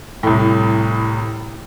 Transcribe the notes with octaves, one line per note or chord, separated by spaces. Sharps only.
C2 A2